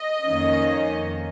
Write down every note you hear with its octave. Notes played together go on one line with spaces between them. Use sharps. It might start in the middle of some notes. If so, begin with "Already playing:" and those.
Already playing: D#5
F2 D#3 A#3 C#4